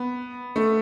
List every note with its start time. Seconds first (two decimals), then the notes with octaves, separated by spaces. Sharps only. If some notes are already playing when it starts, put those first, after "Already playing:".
Already playing: B3
0.56 A3